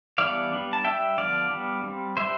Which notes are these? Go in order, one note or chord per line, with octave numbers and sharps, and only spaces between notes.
E3 G3 B3 D4 D5 F5
G3 B3 D4
A5
G3 D4 E5 G5
D3 F3 B3 D5 F5
G3 B3 D4
G3 C4
G3 D4 C5 E5